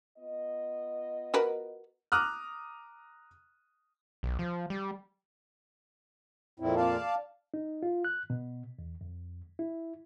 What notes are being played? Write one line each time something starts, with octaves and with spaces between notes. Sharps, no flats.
B3 F4 D#5
F#4 A#4 B4
A#5 D6 D#6 F6 F#6
B1
F3
G3
F2 A#2 C4 E4
D5 F5 A5
D#4
F4
F#6
B2
E2
F2
E4